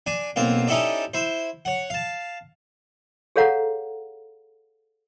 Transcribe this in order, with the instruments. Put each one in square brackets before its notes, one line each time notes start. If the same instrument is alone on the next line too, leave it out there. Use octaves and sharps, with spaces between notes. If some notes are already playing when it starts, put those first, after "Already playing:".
[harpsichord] D4 G#5
B1 A#3 C4 F4
C#4 D#4 E4 G4 A4 D5
E4 C5
C#5 F#5
F5 A5
[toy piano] G#4 A4 C#5 F5 F#5 A#5